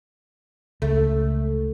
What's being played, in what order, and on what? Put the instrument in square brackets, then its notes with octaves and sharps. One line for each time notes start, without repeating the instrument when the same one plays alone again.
[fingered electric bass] C#2 [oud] A3